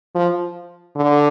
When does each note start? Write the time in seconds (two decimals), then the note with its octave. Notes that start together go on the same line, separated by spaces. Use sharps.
0.15 F3
0.95 D3